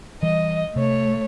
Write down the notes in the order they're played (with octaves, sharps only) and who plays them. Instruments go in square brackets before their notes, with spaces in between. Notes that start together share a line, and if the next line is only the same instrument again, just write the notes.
[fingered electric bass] E3 G3 [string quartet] D#5
[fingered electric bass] C3 [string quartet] A3 C#5